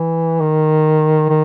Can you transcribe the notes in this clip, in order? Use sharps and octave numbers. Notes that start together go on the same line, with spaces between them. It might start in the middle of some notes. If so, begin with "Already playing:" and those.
Already playing: E3
D#3
D#3